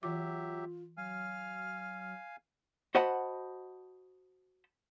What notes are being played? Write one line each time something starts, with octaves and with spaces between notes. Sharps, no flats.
E3 F#3 F4 G4 E5 D6
F#3 F5 G#5 F6
F#4 C5 D#5 F#5 A5 B5